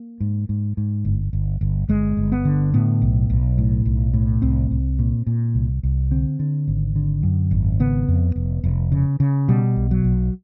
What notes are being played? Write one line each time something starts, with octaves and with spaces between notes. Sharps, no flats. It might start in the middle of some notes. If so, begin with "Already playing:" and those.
Already playing: A#3
G#2
G#2
G#2
G1
G1
G1
G1 G#3
G1
B3
D3
A2 B3
B1
B1
A2
B1
A2
C2 C4
C2
A#2
A#2
C2
C2
D3 C4
D3
G#1
D3
F#2
G#1
C#3 B3
F2
F1
F1
C#3
C#3
B2 G3
B1
F#3
B1